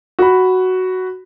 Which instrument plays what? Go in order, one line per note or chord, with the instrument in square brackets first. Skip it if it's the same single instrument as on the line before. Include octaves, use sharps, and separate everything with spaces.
[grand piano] F#4 B5